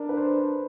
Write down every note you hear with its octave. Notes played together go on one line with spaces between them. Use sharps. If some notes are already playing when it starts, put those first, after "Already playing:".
Already playing: D4 A#4
B4
C5